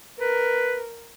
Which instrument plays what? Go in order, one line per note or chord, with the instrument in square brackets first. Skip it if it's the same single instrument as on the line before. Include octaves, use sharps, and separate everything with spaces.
[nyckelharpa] A#4 [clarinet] B4